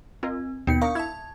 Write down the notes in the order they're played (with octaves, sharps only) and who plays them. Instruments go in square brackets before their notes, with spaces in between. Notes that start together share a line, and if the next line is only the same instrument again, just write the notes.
[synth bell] C4 [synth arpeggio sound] F4 A#4 D#5
[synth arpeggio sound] D#2 B2 C7 [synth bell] B3 D#4 C#7
[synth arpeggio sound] D4 A#4 [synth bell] F5 C#6 D#6
[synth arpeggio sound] E4 E5 [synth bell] A5 G#6